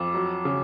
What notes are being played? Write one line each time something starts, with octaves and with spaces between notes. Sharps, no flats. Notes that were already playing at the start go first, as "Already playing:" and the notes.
Already playing: F2 F3 D6
F#3
C#3